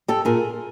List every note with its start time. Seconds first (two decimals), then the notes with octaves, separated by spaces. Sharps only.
0.08 G4 A4
0.25 A#2 G#4 A#4